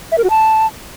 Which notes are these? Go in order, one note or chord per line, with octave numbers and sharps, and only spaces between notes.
E5
A#4
F#4
A5